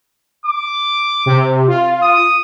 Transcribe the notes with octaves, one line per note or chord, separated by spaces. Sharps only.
D6
C3
F4
D#6